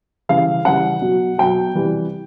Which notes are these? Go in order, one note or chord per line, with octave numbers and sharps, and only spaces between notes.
C#3 E3 G3 F5
C#3 E3 G3 F#5
B2 F#3
B2 F#3 G5
C3 E3 G3